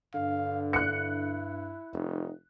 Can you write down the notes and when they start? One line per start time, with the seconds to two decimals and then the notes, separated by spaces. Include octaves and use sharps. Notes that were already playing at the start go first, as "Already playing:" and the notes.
0.14 G2 D3 F5
0.73 E4 F#6 C#7
1.93 F1 D#4